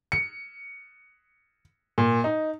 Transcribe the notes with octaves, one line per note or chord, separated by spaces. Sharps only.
C#7
A#2
D#4